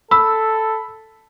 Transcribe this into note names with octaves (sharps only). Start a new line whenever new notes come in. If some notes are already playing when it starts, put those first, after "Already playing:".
A4 B5 E6